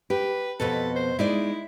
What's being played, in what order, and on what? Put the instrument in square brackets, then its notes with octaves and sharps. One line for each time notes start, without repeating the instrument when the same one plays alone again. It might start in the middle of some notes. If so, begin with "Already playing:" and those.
[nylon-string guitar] G4 [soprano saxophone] B4
[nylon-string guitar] F2 B2 B4 [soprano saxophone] A4
[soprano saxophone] C5
[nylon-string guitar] G#3 D#4 D5 [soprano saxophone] E4